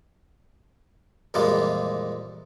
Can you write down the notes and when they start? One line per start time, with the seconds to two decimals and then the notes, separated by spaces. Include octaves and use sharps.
1.34 F2 A#2 E3 G3 G#3 A#3